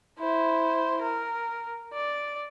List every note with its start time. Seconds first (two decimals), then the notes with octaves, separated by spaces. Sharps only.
0.19 E4 C5
1.02 A#4
1.93 D5